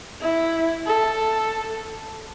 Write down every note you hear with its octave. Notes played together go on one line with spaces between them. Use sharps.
E4
A4